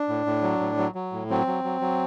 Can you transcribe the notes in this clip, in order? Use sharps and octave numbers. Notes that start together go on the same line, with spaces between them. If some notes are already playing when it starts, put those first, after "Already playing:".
Already playing: D4
A2
A2
F#3
A2
F#3
F#3
A2
F#3 C4
F#3
F#3
F#3